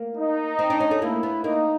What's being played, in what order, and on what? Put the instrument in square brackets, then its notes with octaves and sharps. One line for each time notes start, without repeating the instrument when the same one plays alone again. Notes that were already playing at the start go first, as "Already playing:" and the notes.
Already playing: [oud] A#3
[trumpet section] D#4
[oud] C4
D4
C#4
A3
[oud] A#3 [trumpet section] E4
[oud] B3
[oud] A#3 [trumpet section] D#4